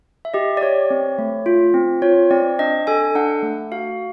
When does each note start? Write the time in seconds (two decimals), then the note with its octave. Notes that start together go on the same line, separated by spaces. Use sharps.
0.25 E5
0.34 G4 D#5
0.57 D5
0.61 G4 C#5
0.90 C4
1.18 A3
1.46 F4
1.74 C4
2.02 F4 C#5
2.31 C4 D5
2.59 D4 D#5
2.87 A4 G#5
3.15 D4 F#5
3.43 A3
3.72 F#4 F5